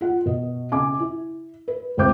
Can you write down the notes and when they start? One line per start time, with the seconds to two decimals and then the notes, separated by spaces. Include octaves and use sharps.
0.01 F4 F#5
0.26 B2 D#5
0.72 C#3 G#5 D6
1.00 E4
1.68 B4
1.97 C#2 C3 C4 C5 D6 G6